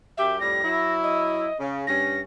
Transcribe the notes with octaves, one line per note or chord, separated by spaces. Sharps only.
F#2 G4 E5
F2 A2 G3 A#6
F#3 E4
D#5
C#3
G2 C#4 A#6